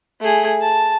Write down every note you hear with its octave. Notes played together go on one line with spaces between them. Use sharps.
A3 G#4
A5